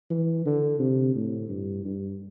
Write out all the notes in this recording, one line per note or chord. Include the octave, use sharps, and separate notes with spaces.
E3
D3
C3
A2
G2
G2